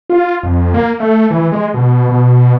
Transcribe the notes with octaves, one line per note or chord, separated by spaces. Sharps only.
F4
F2
A#3
A3
E3
G#3
B2
B2